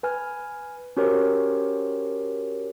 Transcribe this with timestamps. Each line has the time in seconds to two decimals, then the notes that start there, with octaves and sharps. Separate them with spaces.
0.03 B4 G#5 F6
0.97 C#4 F#4 G4 A#4 C5 C#5